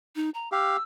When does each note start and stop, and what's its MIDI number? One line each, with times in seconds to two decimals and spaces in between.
0.16 0.30 63
0.34 0.49 82
0.52 0.77 67
0.52 0.77 77
0.52 0.83 88